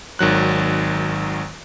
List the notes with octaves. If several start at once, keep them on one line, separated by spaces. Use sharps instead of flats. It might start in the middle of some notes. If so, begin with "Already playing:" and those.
G#1 D#3 F#3 F#6